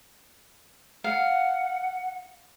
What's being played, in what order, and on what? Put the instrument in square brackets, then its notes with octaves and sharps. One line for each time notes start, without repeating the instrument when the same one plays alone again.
[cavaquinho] F5 [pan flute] F#5